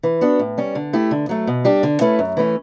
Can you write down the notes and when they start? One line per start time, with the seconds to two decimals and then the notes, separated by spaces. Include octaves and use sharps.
0.03 E3
0.21 B3 D4 F#4
0.39 A2
0.58 G3 C#4
0.75 D3
0.93 A3 E4 G4
1.11 D3
1.29 F#3 A3
1.47 B2
1.65 G3 D4 G4
1.83 D3
2.01 A3 C#4 E4 B4
2.19 F#2
2.37 E3 A3 C#4